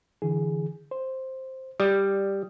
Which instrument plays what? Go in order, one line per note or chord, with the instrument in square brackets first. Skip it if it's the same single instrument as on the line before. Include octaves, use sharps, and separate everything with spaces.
[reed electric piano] D3 E3 G#4
C5
[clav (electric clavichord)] G3 [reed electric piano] D5 D#6